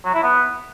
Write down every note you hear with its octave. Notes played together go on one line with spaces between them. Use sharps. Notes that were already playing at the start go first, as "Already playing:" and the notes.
F#3
E4
B3